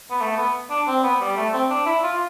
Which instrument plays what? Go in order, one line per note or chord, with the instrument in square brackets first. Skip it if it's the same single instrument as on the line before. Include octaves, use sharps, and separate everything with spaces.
[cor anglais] B3
A3
B3
D4
C4
B3
G3
A3
C4
D4
E4
F4